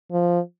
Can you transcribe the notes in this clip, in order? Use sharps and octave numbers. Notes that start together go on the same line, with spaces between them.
F3